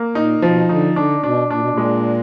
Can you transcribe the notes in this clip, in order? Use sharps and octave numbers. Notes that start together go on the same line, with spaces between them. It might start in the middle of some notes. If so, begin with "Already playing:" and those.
Already playing: A#3
A#2 D#4
D3
B2 F3
D3 D#4
D3 D4
B2 D4
A#2 D4
B2
A#2
G#3